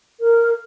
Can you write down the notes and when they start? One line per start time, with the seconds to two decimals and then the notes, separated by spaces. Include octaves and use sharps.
0.20 A#4